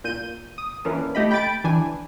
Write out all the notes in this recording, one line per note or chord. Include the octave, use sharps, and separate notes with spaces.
A#2 G6 D#7
D#6
E3 A#3 C#4 D4
A3 G4 D#5 B5
G5 B5 G6 A6 D7
E3 D4 G#5